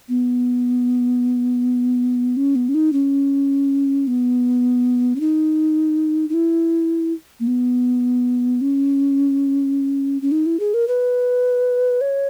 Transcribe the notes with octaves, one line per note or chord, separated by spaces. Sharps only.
B3
C#4
B3
C#4
D#4
C#4
B3
C#4
D#4
D#4
E4
A#3
B3
C#4
C#4
D#4
E4
G#4
A#4
B4
C#5